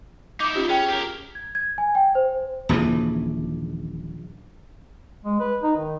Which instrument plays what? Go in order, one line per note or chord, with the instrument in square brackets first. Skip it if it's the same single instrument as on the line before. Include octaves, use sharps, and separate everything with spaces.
[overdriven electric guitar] D#4 E4 [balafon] D6
[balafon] C#4 F4 G4
[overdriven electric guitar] C#4 [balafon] G#4 G5
[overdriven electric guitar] G4 A#4
[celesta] G#6
G#6
G#5
G5
C5
[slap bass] D#1 A#1 C#3 E3
[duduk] G#3
B4
D#4
D#3